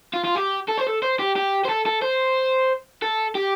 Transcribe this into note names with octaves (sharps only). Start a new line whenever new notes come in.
F4
F4
G4
A4
C5
A4
C5
G4
G4
C5
A4
A4
C5
A4
G4